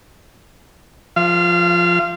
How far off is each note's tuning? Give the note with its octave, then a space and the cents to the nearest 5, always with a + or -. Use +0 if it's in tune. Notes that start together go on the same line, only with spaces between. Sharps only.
F3 +0 F5 -30